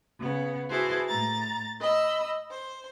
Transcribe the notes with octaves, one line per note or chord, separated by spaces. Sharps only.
C#3 B3
E4 F#4 G#4 B4 C5 A5
A2 A#5 A6
D#5 B5 E6
C5